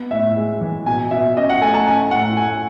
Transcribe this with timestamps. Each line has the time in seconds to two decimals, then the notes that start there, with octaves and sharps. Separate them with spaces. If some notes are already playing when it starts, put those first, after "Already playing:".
Already playing: B3
0.11 A2 E5
0.36 G#3
0.61 E3
0.86 B2 G#5
1.11 B2 E5
1.37 C#4 D#5
1.49 F#5
1.61 A3 G#5
1.74 A5
1.87 C#4 G#5
2.11 A2 F#5
2.37 A3 G#5